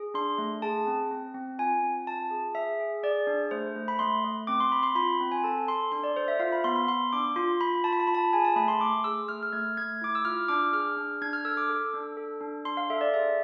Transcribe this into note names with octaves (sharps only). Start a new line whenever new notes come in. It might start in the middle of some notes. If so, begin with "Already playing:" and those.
Already playing: G#4
D4 C6
A3
G#4 A5
C4
C4
C4
F4 G#5
C4
F4 A5
G#4
G#4 E5
G#4
G#4 D5
D4
A3 C5
A3
B5
A3 C6
A3
C4 D6
C6
C4 B5
C6
F4 B5
C4
G#5
A4 A5
A4 C6
D4 C6
D5
A4 C5
E5
F4 F5
B5
B3 C6
B5
B3 C6
D4 D6
F4 C6
F4 B5
F4 A5
B5
A5
F4 B5
A5
G#4 G#5
A5
A3 B5
C6
A3 D6
G#4 E6
A3 F6
F6
A3 G#6
A3 G#6
E4 D6
E6
F4 F6
D4 D6
G#4 F6
D4
D4 G#6
F6
A4 E6
D6
A4
D4
A4
D4
D4 C6
F5
A4 E5
D5
G#4 E5